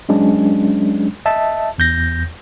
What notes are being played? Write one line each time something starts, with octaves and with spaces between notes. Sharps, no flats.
F#3 G#3 C#4 D4
D#5 E5 A5
E2 G6 A#6